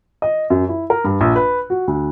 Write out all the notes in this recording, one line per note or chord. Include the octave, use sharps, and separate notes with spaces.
D#5
F#2
E4
A#4
G2
A#1
B4
F#4
D2